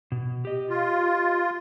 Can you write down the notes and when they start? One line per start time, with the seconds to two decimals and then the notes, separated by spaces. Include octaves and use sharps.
0.12 B2
0.45 G4 D#5
0.69 F4